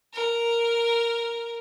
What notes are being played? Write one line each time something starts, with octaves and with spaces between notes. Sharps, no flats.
A#4